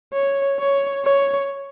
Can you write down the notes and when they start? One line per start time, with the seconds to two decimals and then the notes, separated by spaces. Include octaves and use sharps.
0.14 C#5
0.59 C#5
1.04 C#5